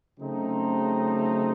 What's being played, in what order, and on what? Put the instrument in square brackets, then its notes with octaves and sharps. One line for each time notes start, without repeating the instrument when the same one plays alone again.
[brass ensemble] C#3 F#3 A3 C4 D#4